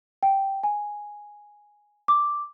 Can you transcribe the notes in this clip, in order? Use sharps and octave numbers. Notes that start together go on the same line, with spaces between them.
G5
G#5
D6